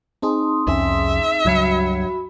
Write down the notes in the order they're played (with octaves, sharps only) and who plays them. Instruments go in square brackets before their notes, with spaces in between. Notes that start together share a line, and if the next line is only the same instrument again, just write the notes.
[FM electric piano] C4 D#4 G#4 [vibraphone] A5 C6 D#6
[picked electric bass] C2 F2 C#4 [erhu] E5
[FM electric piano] C#2 G#6 C#7 [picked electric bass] G2 F#3 [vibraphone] F#4 B5